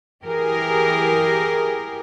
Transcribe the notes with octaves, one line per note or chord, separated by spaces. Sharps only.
E3 G4 G#4 A#4